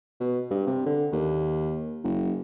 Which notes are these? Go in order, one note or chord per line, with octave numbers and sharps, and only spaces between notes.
B2
G2
C3
D3
D#2
F#1